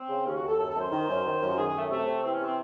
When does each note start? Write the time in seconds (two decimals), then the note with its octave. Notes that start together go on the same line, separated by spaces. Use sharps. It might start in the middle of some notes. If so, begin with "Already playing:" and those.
Already playing: C4
0.09 C#3
0.25 D#2 C#4
0.36 F#4
0.43 D#2
0.48 A4
0.58 F#2 A4
0.69 A4
0.76 F#2 C5
0.92 D#3
1.08 F#2
1.25 D#3
1.41 F#2
1.49 F#4
1.57 D#3 G#4
1.67 G#4
1.74 F#2 A3
1.90 C3 A3
2.07 C3
2.23 E3 C4
2.34 C#4
2.39 C3
2.44 C4